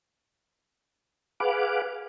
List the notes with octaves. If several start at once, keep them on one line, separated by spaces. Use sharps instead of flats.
G#4 B4 F5 F#5 D6